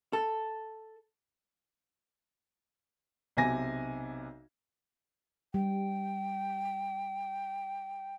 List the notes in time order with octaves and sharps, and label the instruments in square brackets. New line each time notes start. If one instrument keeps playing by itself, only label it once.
[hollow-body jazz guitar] A4
[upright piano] B1 C3 G#5 A#6
[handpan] G3 [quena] G5